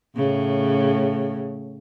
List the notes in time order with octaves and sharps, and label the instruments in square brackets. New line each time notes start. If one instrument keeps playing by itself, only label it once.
[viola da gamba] A2 C#3